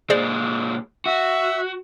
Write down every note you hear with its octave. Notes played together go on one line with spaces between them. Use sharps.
A#2 G#3 G#4 C5 D5
F#4 E5